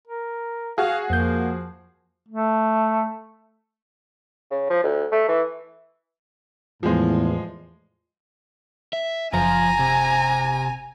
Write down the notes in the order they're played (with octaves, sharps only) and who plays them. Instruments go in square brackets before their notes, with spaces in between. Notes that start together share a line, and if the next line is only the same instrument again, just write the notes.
[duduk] A#4
[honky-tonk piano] F#4 G#4 [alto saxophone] F5
[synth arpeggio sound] F2 G6 [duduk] F3 [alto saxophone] A#3
[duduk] A3
[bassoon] C#3
F3
D2
A3
E3
[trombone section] E2 A2 [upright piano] F3 G#3
[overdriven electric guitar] E5
[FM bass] F#1 [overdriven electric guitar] F3 [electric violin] G#5 [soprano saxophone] A#5
[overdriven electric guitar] C3